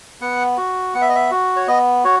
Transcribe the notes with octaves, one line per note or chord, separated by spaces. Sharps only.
B3 F#5
F#4
B3 F#5
E5
D#5
E5
F#4
C#5
B3 D#5
F#4 C#5